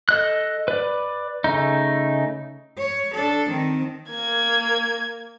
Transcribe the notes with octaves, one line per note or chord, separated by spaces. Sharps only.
A4 D#5 F#6
B4 D5
C#3 A3 D#4
C#5
D4 A4
D#3 C4
A#3 G#6